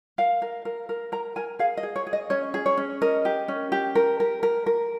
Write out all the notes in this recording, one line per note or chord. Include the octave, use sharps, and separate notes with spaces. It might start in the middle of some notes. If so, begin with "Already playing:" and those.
A#4 F5
A#4
A#4
A#4
A#4 A#5
A#4 G#5
G#4 F5
D#5
G#4
C#5
G#4
D#5
C#4 C#5
G#4
C#5
C#4
A#4 D#5
G4
C#4
G4
A#4
A#4
A#4
A#4